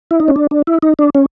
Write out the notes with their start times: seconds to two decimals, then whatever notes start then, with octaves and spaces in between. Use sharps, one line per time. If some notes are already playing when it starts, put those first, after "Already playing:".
0.11 E4
0.20 D#4
0.28 C#4
0.36 D4
0.51 D4
0.67 E4
0.82 D#4
0.99 D4
1.15 C#4